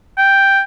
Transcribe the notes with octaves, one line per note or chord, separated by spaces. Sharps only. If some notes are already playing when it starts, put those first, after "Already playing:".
G5